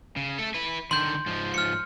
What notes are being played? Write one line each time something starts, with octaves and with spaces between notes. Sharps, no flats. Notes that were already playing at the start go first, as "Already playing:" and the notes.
C#3
A3 A4
E4 B4
D3 D#3 C6 G6
G#2 F3
F6 C#7